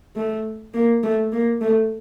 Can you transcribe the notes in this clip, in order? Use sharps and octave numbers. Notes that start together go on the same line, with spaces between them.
A3
A#3
A3
A#3
A3